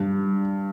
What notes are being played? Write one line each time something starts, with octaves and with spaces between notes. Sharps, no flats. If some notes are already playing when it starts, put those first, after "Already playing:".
Already playing: G2